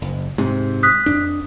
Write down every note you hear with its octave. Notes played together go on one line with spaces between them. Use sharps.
F#1
G#2 C3
D#6 F#6 B6
F2 D4